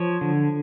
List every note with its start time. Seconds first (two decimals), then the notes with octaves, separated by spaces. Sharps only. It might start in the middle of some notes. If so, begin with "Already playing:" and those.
Already playing: F3 C#5
0.21 D3